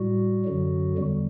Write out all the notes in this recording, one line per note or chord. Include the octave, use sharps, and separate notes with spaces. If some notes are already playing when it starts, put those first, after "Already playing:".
Already playing: A2 G3 F#4
F#2 D3 F#3
E2 D3 G3